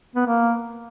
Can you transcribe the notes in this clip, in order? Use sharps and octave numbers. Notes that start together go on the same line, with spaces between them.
B3
A#3